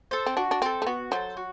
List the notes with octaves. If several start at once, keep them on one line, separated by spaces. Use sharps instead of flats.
A4 C5
C4
D4 F#4
D4
C4 A4 C5
A3
B3 F#4
F#3 A4 C5
F#4